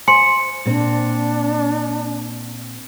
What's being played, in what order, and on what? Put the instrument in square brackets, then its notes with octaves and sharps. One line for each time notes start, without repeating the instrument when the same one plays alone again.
[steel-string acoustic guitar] C5 [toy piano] G#5 C6 [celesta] C#7
[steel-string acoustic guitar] A#2 C4 [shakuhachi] D4